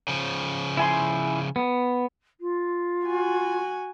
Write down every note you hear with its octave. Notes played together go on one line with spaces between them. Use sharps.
C#3 F3
E4 G#5 C6
B3
F4
F#4 G#5